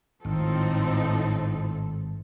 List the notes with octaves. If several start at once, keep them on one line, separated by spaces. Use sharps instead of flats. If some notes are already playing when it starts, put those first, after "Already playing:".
G#1 A2 F3 C4 D#4 A4